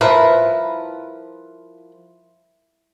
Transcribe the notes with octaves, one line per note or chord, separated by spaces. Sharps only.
F3 E4 A#4 B4